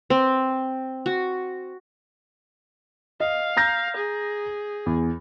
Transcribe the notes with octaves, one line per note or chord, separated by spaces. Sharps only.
C4
F#4
D#5 F5
A#5 G6 A#6
G#4
E2